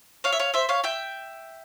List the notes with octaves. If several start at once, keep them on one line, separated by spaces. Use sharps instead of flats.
C#5 F5
E5
C#5 F5
C5 E5
C#5 F5
E5 G5